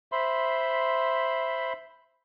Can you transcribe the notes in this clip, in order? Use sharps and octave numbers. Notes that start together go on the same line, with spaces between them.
C5 E5 B5 C6